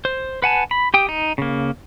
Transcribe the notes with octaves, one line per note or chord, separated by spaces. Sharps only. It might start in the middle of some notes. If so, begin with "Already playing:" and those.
C5
B4 F#5 G#5 A5
B5
G4 G5 D#6
D#4
C#3 A#3